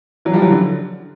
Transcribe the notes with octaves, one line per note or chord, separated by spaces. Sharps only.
E3 F#3
F3 G3
E3 F#3
D3